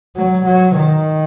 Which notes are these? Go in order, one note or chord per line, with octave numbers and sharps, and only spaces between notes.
F#3
F#3
D#3